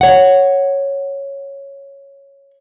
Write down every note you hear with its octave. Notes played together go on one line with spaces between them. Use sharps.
C#5 F#5